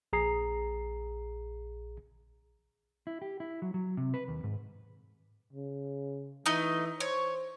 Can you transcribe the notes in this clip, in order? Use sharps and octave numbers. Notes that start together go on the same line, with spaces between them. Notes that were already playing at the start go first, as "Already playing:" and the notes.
A#1 G#4 A#5 C7
E4
G4
E4
F#3
F#3
C3
B4
D#2
G#2
C#3
E3 A3 D#4 D#5
C5 C#5